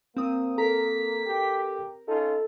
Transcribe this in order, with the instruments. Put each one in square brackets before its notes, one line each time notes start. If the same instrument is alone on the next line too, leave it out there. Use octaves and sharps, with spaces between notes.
[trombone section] A#3 [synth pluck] C4 D#6
[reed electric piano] A4 [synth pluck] A#4 A#5 [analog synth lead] B6
[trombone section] G4
[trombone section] C#4 D#4 F4 [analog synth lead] A4